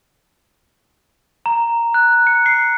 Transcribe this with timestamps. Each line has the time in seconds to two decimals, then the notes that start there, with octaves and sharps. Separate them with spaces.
1.46 A#5
1.94 F#6
2.27 C#7
2.46 C7